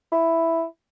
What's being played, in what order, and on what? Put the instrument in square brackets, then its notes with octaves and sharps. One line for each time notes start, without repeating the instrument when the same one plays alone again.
[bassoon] E4